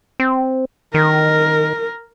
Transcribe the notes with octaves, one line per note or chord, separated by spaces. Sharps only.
C4
D#3 A#4